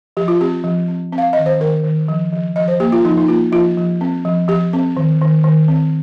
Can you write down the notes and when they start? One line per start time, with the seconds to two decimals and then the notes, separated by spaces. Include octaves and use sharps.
0.17 F3 G4
0.28 F4
0.41 C4 G4
0.64 F3
0.88 C4
1.12 C4
1.18 F5
1.33 D#3 D#5
1.46 C5
1.60 D#3 A#4
1.84 D#3
2.08 F3
2.33 F3
2.56 F3 D#5
2.68 C5
2.80 A#3 G4
2.92 F4
3.05 F3 D#4
3.17 D#4
3.28 A#3 F4
3.52 F3 F4
3.77 F3
4.01 C4
4.25 F3
4.48 F3 G4
4.73 C4
4.97 D#3
5.21 D#3
5.44 D#3
5.68 C4